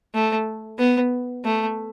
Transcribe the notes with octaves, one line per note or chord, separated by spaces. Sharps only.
A3
B3
A3